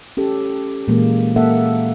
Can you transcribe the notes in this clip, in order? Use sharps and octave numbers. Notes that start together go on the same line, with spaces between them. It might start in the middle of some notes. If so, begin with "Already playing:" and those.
C#4 G4 A4
A#2 E3 G#3 A#3
A#3 A4 E5 F#5